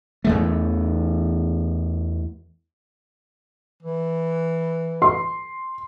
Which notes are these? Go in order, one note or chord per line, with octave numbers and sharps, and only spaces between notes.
E2 E3 A3
E3
C6